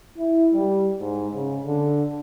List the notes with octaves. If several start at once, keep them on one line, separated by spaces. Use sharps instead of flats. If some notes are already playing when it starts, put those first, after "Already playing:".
E4
G3
G#2
C#3
D3